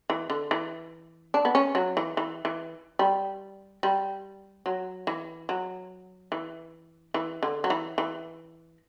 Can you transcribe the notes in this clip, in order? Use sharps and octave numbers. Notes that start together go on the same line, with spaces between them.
E3
D3
E3
D4
B3
C#4
F#3
E3
E3
E3
G3
G3
F#3
E3
F#3
E3
E3
D3
F#3
E3
E3